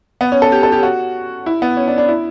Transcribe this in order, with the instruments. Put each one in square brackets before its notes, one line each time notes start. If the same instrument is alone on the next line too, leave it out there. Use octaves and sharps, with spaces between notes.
[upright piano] B3
C#4
A4
G4
A4
G4
F#4
E4
B3
C#4
D4
D4
E4